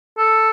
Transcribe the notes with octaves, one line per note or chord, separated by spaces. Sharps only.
A4